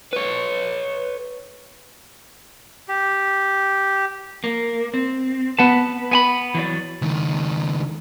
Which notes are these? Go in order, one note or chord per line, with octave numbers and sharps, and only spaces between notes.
B4 C#5
G4
A#3
C4
B3 B4 F#5 A5
B3 G#5 B5
E3 F#3 D5
C#2 D#3